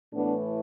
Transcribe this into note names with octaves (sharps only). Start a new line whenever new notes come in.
A2 E3 A3 B3 D4